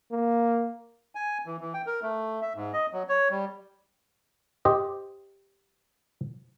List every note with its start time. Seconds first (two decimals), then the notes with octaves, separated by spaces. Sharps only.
0.11 A#3
1.15 G#5
1.46 E3
1.61 E3
1.74 G5
1.86 A#4
2.02 A3
2.42 E5
2.55 G#2
2.73 D#5
2.93 F#3
3.09 C#5
3.31 G3
4.65 G4 C5 D#5